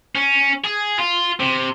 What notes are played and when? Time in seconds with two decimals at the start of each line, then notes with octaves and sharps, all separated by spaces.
0.15 C#4
0.64 G#4
0.99 F4
1.40 C3